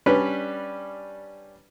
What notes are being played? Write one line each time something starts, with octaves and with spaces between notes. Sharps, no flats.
G3 C#4 D4 B4